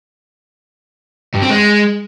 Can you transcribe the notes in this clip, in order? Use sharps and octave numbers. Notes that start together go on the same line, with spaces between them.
G2
C4
G#3